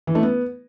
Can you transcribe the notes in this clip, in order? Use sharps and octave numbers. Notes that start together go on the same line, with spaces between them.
E3
A3
B3